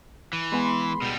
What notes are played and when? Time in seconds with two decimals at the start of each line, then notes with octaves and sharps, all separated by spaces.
0.33 E3
0.52 G#3 B3 G#4 B5 C6
1.02 B2 G3